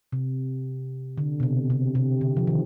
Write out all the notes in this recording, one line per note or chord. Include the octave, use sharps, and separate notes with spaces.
C3
D3
B2
C3
C3
C3
D3
F3
D#3